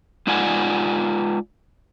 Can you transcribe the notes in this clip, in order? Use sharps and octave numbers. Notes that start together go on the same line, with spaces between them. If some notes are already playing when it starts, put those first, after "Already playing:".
G#3 D#4 F4 D5 F#5 G#5